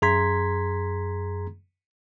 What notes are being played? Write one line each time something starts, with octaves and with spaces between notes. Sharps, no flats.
F#2 G#4 A#5 C6 G#6 B6